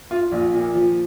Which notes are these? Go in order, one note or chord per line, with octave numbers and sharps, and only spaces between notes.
F4
A#1
A#2
F3